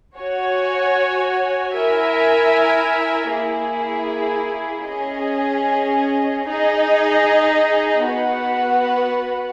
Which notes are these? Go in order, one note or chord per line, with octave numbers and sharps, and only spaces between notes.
F#4 C#5 G#5
E4 A#4 E5 G#5
A#3 E4 G#4
C#4 G#4 D#5
D#4 G#4 D#5
B3 F#4 B4 F#5